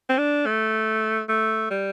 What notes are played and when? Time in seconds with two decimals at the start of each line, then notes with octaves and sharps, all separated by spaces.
0.09 C4
0.18 D4
0.46 A3
1.29 A3
1.71 G3